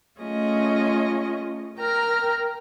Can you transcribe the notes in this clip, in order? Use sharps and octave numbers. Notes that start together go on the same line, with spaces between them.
A3 C#4 F4 G#4 D#5
A#4 G5 A#5 F6